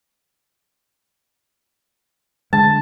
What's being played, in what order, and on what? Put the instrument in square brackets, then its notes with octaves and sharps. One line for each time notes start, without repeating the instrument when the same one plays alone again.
[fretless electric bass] D3 G#3 [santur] A5